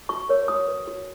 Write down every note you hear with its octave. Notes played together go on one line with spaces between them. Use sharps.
F#4 C#6
A#4 C#5
F#4 D#6
B4
F#4